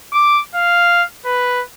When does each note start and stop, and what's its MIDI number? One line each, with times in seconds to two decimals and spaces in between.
0.13 0.41 86
0.55 1.03 77
1.25 1.62 71